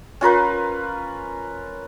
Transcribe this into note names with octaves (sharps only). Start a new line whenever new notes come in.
C#4 F4 A#4 B4